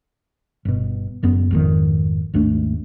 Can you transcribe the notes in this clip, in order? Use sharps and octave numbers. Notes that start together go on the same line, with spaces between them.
G1 B2
F#1 F#2 B3
G#1 F2 D#3
G#1 D#2 A3 D4